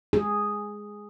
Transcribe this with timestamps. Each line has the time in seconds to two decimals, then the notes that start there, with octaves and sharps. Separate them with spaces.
0.13 G#4